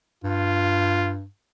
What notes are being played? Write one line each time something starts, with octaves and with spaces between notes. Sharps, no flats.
G2 F4